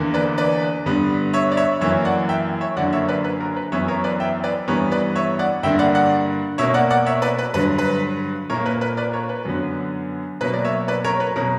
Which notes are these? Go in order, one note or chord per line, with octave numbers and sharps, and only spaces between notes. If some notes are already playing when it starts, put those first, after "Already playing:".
Already playing: E2 D3 A#3
B4 D5
B4 D5
G2 D3 G3 B3
C#5 E5
D5
C#5 E5
F#2 E3 A#3 C#5 E5
D5 F#5
E5 G5
C#5 E5
F#2 D3 A#3 D5 F#5
C#5 E5
B4 D5
B4
A#4
B4
F#2 E3 B3 C#5 E5
A#4 C#5
B4 D5
E5 G5
B4 D5
G2 E3 G3 B3 A#4 C#5
B4 D5
C#5 E5
D5 F#5
G2 D3 A#3 E5 G5
D5 F#5
D5 F#5
B2 A#3 C#5 E5
D5 F#5
D5 F#5
C#5 E5
B4 D5
B4
G2 D3 F#3 B4
B4
A#2 A#3 A#4 C#5
B4
B4
B4 D5
A#4 C#5
B4
F#2 D3 F#3 B3
B2 F#3 A#3 B4
D5
C#5 E5
B4 D5
A#4 C#5
B4
B2 F#3 A#4